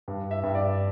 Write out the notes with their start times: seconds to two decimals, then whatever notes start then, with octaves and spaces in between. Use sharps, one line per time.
0.08 G2
0.31 E5
0.43 G2
0.55 D5